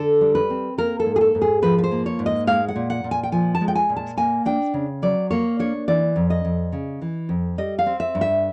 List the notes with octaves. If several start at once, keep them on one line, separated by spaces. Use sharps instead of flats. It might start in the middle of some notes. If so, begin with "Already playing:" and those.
Already playing: D3 A4
G3
B4
C4
A#3 A#4
A4
G#2
G#4
A4
G#2
G#4
F3 B4
B4
C5
A#3
C#5
G#2
D#5
G#3 F5
F#5
A#2
F#5
A#2
G#5
G5
F3 G#5
A5
G#3
G5
G#5
A#2
A5
A#3 G#5
D4 G5
C#3
F#3 D5
A#3 C#5
D4 C#5
E3 D5
F2
D#5
F2
C#3
E3
F2
G3 D#5
F5
C4
E5
G2
E5